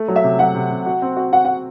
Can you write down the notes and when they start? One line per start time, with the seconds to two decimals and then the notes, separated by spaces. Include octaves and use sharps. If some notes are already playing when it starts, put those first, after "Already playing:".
Already playing: A3
0.08 F#3
0.16 E5
0.24 C3
0.39 F#3 F#5
0.55 C3
0.71 C3
0.86 F#4
1.02 C4
1.17 F#4
1.33 F#4 F#5
1.45 F#4 F#5